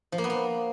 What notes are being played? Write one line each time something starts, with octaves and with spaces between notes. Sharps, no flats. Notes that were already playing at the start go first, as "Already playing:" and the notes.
F3
A#3
B3
A#3